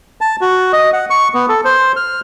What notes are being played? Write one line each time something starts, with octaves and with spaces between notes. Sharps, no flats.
A5
F#4
D#5
F#5
C#6
B3
A4
C5
F6